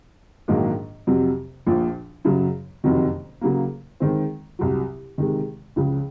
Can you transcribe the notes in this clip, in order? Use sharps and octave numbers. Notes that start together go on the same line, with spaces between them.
A#1 G#2 D#3 F#3 A#3
F2 C3 F#3
A#1 A#2 F3
F#2 C#3 F#3
F#1 F2 C3 D#3 F#3
C#3 F#3 A#3
D#3 G#3 C4
C2 C3 F#3
C3 D#3 G#3
C#2 C#3 F3